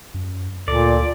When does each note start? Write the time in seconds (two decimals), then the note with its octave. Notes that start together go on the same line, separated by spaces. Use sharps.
0.14 F#2
0.68 D2 A#2 A4 D5